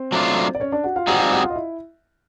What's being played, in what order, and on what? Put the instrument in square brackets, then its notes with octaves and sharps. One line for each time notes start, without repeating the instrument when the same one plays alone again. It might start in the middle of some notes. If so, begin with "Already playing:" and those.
Already playing: [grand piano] C4 C5
[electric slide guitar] F#3 A3 D4 F4
[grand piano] D5
C#4 C#5
D4 D5
F#4 F#5
F4 F5
[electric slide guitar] G3 C4 D#4 G#4 [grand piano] F#4 F#5
[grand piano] F4 F5
F#4 F#5
F4 F5
D#5
E4 E5